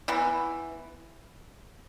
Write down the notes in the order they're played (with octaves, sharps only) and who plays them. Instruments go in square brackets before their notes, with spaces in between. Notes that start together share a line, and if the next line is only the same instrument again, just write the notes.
[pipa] E3 B3 E4